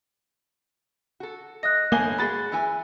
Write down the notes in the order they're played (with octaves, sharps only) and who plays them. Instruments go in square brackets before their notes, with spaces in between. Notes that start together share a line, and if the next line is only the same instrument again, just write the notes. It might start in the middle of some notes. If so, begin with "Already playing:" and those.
[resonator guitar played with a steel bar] F#4 A4
[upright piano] D#5 [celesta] F#6 A#6
[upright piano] G1 G#5 G7 [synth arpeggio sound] A#3
[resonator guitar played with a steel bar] G#3 F#4 G#4 [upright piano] B5 A6
[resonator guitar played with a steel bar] E3 E4 G#5